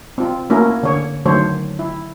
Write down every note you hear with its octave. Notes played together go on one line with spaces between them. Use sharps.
C4 F4
A3 A#3 C#4 E4 F#4 A#4
D3 C#5
D3 D#3 F#3 A3 C5 C#5
E4